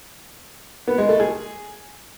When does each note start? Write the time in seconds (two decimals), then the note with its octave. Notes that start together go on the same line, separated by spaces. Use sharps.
0.87 B3
0.98 G#3
1.09 A3
1.20 G#4